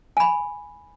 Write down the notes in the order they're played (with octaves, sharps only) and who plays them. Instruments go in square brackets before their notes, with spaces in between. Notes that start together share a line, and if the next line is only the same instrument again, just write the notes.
[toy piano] G#5 B5